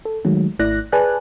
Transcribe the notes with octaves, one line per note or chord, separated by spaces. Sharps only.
A4
D#3 F#3 G#3 A3
G#1 A3 E4 D5 F#6 A#6
G#4 B4 D5 G#5 A5 F#6